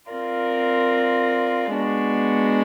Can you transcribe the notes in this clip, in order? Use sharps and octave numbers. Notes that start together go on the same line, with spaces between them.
C4 F4 A#4 D5
G#3 B3 D4 F#4